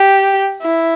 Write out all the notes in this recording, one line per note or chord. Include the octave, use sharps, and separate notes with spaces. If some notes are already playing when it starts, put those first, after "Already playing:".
Already playing: G4
E4